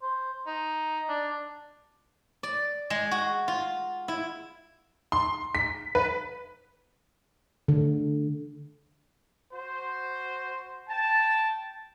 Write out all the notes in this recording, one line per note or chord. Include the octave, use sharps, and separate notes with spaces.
C5
D#4
D4
D5
G#3
F#4
F4
E4
C6
B6
B4
D3
F#4 C5
G5 A5